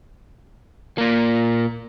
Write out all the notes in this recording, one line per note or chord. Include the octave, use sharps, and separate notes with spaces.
A#2 A#3